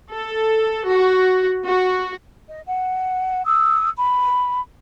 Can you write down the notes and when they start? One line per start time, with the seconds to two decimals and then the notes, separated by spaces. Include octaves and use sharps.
0.14 A4
0.89 F#4
1.66 F#4
2.48 D#5
2.67 F#5
3.45 D#6 E6
3.98 B5